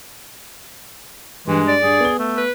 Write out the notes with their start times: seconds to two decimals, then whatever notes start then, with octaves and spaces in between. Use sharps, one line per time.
1.47 G2 E3 G#3
1.68 D5
1.82 G2 G#4
2.00 B3 G7
2.19 A3
2.37 B4